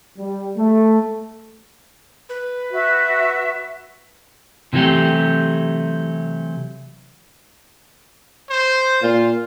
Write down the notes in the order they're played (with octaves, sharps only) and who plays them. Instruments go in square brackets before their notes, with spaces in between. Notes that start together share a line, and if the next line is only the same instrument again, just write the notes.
[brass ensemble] G3
A3
[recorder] B4
[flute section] F#4 E5
[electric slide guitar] C3 E3 F#3 A3 G4
[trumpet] C5
[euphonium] A#2 [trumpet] F4